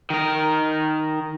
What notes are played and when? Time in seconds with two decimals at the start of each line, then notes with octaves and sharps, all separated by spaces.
0.10 D#3 A#4